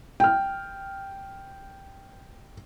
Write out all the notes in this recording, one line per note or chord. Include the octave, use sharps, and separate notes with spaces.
G5 F6